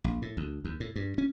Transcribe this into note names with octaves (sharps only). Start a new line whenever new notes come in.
A#1
A2
D2
D#2
A2
G2
C#4